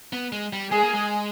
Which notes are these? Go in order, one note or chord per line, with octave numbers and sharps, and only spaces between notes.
B3
G#3
G3
G#3 G#4
A#3
G#3